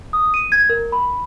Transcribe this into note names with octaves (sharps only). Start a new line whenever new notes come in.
D#6
D#7
G#6
A#4
B5